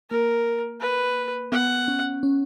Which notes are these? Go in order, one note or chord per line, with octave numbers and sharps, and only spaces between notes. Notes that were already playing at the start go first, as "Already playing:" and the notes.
A#3 A#4
B4
B3 F#5
C#4
C#4